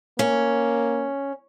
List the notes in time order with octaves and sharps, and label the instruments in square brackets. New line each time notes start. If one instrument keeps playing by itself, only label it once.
[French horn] A#3 [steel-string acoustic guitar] C#4